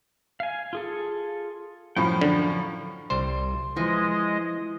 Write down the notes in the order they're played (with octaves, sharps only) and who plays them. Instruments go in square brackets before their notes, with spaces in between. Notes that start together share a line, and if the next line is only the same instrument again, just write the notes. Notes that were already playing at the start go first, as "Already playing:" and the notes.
[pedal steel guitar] F5 G#5
F4 G#4 A4
[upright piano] F#2 A2 F3 [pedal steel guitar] F5 G5
[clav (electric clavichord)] D3
[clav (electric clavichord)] C2 G3 C5 [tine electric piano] C6
[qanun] E3 [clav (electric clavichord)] F3 [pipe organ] G#3 D#5